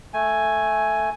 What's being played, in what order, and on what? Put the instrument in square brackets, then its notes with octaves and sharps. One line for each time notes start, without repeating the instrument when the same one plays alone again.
[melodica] A3 G#5